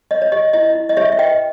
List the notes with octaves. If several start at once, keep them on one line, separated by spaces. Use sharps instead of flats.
C#5 D#5
C#5
G4 D#5
E4 D#5
E4
D#5
G4 C#5 E5
E5
B4 D#5 G5